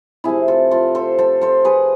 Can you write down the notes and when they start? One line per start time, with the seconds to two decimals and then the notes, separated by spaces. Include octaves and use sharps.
0.24 C3 F3 A3 E4 G#4
0.48 F4 A4
0.71 F4 A4
0.95 A4 C5
1.18 A4 C5
1.41 A4 C5
1.65 G#4 B4